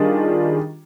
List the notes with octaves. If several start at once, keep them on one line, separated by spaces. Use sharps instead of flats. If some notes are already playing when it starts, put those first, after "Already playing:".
Already playing: D#3 G3 D4 F4 G#4